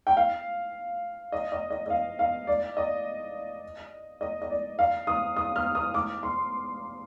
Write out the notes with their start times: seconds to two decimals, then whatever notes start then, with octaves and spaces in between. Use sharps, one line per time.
0.07 G5
0.17 F5
1.32 D#5
1.52 D#5
1.70 D#5
1.86 D#5
1.90 F5
2.19 F5
2.47 D5
2.77 D#5
4.21 D#5
4.42 D#5
4.50 D5
4.79 F5
5.07 D#6
5.36 D#6
5.56 F6
5.75 D#6
5.94 D6
6.23 C6